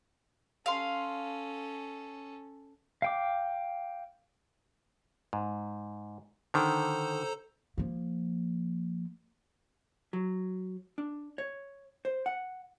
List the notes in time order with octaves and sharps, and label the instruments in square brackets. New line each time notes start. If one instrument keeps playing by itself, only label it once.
[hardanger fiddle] C#4 A4 [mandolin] F5 C6
[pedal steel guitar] F5 G5 D6
[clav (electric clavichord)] G#2
[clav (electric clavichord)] D3 D#3 [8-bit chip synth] A4 C5 A#5
[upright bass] F3 A#3
[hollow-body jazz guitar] F#3
D4
C#5
C5
F#5